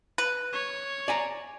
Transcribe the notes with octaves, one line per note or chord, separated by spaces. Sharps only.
B4
C#5
D5 G#5 A#5